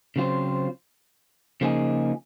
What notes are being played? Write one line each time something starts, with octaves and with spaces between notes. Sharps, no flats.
C#3 F#3 C4 F4 C5
C#3 F3 A#3 D#4 G#4